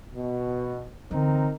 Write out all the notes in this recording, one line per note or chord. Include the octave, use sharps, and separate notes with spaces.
B2
D3 E3 C4 D#4 A#4